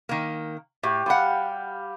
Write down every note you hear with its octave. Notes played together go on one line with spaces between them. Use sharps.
D#3 A#3
A2 G4 D6
G3 F5 F#5 B5 D6